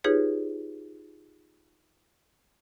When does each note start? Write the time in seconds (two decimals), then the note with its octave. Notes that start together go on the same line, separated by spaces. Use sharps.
0.04 D#4 F4 G4 G#4 B4 C#5